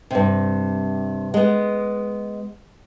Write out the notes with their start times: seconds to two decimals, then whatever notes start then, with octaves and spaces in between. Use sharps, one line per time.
0.11 G2 C3
1.34 G#3 B3